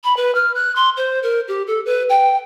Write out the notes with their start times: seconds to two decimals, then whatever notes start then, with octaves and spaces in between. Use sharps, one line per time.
0.04 B5
0.17 B4
0.35 F6
0.55 F#6
0.75 C6
0.97 C5
1.23 A#4
1.48 G4
1.67 A4
1.86 B4
2.09 G5